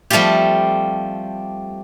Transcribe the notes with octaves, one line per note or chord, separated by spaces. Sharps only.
F3 G3 A3 C4 F4 G4